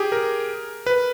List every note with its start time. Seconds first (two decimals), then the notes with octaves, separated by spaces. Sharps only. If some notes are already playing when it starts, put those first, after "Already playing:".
Already playing: G4 G#4
0.12 A#4
0.86 B4